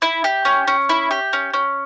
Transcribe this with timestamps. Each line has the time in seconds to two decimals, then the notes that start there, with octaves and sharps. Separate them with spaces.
0.02 E4
0.24 G4
0.45 C#4
0.67 C#4
0.89 E4
1.11 G4
1.33 C#4
1.54 C#4